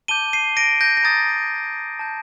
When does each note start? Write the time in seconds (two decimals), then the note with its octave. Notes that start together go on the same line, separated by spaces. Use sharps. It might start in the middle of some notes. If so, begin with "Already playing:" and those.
0.08 A5 D6 G6 D#7 G7
0.33 C7 D#7
0.57 A#6 D7
0.81 G6 A#6
0.97 A#6
1.03 A#5 D#6 G6 A6
1.99 A5 D#6 G6